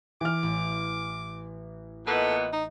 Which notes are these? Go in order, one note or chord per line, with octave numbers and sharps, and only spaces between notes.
E3 D6 F6
A1
A#2 E3 B3 A4 D#5
D#4